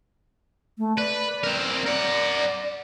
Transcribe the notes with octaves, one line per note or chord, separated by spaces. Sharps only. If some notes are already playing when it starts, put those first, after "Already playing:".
A3
B4 D5
C4 A#4
A#4 D5 F#5